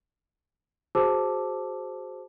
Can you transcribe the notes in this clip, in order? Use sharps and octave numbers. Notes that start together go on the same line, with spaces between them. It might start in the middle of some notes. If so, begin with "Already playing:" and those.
F#4 G#4 C5 A5 D6 E6